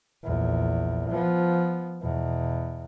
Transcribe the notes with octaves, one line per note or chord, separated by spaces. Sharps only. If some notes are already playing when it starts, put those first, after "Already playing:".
A#1 E2
F3 B3
E2 B2